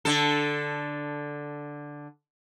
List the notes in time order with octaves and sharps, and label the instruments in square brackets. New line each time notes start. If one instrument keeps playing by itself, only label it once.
[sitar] D3 A4